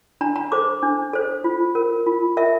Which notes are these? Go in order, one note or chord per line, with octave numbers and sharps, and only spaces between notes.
D4 A#5
A#5
A4 C5 D6
D4
A4 C5
F4
A#4
F4
A#4 E5